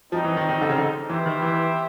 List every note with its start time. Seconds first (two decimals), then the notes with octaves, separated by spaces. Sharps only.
0.12 F3 G3 C4 D#4
0.24 E3
0.37 D#3
0.49 D#3
0.61 D3
0.69 C#3
0.78 D3
1.09 E3 B3 E4 G4 C5 E5
1.26 D#3
1.42 E3